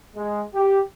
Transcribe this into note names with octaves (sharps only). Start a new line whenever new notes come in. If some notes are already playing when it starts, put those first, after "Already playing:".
G#3
G4